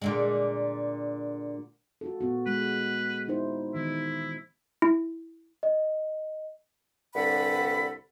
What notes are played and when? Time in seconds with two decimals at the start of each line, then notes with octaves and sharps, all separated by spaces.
0.02 A#2 D3 G#3
2.01 F4 F#4 A4
2.21 A#2 B3 F#4
2.47 G#3 B4
3.28 D#4 E4 C5
3.74 D#3 E3 B3 E4
4.82 E4
5.63 D#5
7.15 C2 G2 D3 A4 F#5 B5